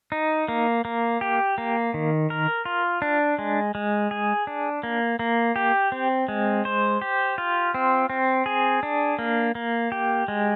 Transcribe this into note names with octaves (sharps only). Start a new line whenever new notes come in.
D#4
A#3
A#3
G4
A#3
D#3
A#4
F4
D4
G#3
G#3
G#4
D4
A#3
A#3
G4
C4
G#3
C5
G4
F4
C4
C4
G#4
D4
A#3
A#3
G4
G#3